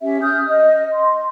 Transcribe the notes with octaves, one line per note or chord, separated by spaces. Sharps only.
C#4 G4 E5
D#6 F6 G6
D#5
C6